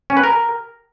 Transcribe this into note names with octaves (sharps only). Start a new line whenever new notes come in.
C#4
B4
A#4